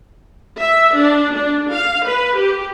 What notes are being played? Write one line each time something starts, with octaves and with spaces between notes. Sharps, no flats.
E5
D4
D4
F5
B4
G4